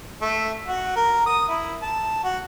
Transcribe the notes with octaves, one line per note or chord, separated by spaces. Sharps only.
A3
F#4
A#4
D#6
E4
A5
F#4